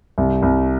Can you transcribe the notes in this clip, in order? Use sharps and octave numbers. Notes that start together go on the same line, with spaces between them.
C2
C2